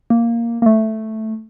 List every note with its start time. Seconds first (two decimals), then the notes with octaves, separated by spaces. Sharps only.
0.10 A#3
0.62 A#3
0.66 A3